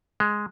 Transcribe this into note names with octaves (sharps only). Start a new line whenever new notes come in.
G#3